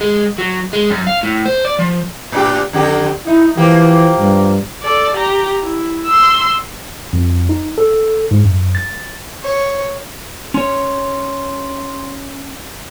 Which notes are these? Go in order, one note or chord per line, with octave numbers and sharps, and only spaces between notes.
G#3
F#3
G#3
F#2
F5
A2
C5
D5
F3
A2 D4 G4
F2 D3 G4
D#4 E4
E3 F3 A#3 G4
G2
A4 D5
G4 A#5
E4
C6 E6
F2
D#4
A4
G#2
F#2
A6
C#5
C#4 C#5 C6